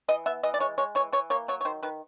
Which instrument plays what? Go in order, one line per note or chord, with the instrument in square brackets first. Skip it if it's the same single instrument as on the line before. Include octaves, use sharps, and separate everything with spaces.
[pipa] E3 D#5
B3 E5
E3 D#5
D5
G#3 C#5
G#3 C#5
E3 C#5
E3 C#5
A#3 C#5
F#3 C#5
C#5
D#3 C5
D#3 B4